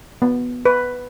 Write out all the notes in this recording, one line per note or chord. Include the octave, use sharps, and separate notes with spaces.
B3
B4